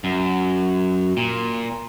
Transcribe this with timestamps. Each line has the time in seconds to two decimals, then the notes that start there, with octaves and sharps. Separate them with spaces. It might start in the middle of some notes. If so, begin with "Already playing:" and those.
0.04 F#2
1.17 A#2